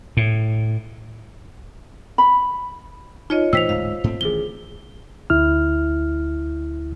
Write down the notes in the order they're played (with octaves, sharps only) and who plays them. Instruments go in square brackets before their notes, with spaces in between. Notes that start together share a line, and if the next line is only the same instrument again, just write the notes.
[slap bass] A2
[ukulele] B5
[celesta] D#4 [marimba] F4 C#5 D#5
[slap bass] A2 E3 [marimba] C5 G5 [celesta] E6 B6 F7
[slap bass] D1 G#2 [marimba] F5
[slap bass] G#2 A3 C4
[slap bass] A1 D#3 [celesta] G#4 G7
[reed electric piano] D2 E4 F6